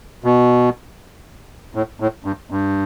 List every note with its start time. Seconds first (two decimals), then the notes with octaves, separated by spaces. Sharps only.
0.24 B2
1.75 A2
2.00 A2
2.25 G2
2.50 G2